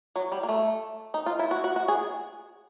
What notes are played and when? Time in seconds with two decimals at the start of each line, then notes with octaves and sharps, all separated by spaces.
0.16 F#3
0.32 G3
0.43 A#3
0.49 A3
1.14 D#4
1.26 F4
1.39 E4
1.51 F#4
1.64 F#4
1.76 F#4
1.88 G#4